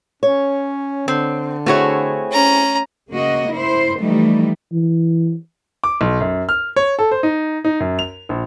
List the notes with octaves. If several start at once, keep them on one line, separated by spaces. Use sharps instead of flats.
C#4 C#5
D3 C4
A3 C4 E4 F#4 G#4 C#5
C#4 A#5
C#3 A#3 F#4 D#5
E4 C5
E3 F3 G3 A3 D#4
E3
D6
B1
F#2
F6
C#5
A4
C5
D#4
D#4
F#2
F7
A#1